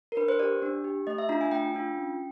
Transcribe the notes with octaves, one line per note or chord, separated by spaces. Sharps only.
A#4
D4 B4
C5
G4 D5
D4
G4
A3 D#5
E5
D4 F4 A#5
G#5
A3 G5
D4 F4
C#4